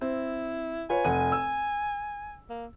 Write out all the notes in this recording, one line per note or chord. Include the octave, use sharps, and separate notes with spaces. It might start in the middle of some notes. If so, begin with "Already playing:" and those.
C4 E4
F4 B4 C#5 G#5
F1 F#5 D#7
E6
A#3